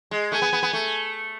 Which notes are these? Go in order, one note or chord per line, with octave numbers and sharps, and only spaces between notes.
G#3
A3 G#5
B3
B3
B3
A3